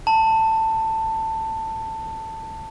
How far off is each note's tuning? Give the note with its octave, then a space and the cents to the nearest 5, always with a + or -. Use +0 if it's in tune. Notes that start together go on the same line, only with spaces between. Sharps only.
A5 +15